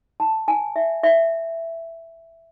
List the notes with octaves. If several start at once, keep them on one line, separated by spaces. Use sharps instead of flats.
A5
G#5
E5
E5